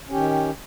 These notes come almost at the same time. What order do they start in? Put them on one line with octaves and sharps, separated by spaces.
C#4 G4 D#3